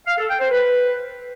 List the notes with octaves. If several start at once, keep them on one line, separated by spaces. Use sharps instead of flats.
F5
A4
G5
C5
B4